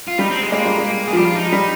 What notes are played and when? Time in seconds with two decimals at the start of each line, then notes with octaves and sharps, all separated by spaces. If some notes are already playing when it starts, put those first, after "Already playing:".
0.08 F4
0.18 G3 D#4
0.30 C4
0.41 G#3
0.52 G#3 A#3
0.65 G3
0.78 G#3
1.08 G#4
1.13 F3
1.17 G3 G4
1.26 F4
1.36 D#4
1.52 G3